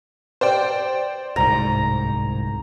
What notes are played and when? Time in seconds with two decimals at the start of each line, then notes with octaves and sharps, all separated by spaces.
0.41 C5 D5 G5
1.36 D1 C2 G#2 A#5